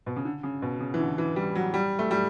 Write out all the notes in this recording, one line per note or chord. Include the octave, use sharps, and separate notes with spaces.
B2
C#3
D3
C#3
B2
C#3
E3
D3
E3
G3
F#3
G3
A3
G3